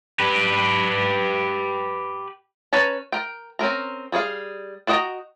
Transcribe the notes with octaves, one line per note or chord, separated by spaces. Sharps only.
G4 B4
C#4 B4 C#5 A5 A#5
A#4 G5
C4 C#4 A#4 A#5
G3 G#4 C#5 F5
D4 F#4 D#5 G5 A#5